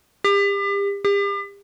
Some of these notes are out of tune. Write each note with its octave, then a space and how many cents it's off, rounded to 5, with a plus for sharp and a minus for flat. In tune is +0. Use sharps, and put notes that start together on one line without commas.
G4 +35
G4 +40